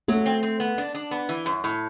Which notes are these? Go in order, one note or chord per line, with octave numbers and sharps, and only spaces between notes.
F#3 A3
C4
C4
B3
D4
D4
B3
E3
F#2
A2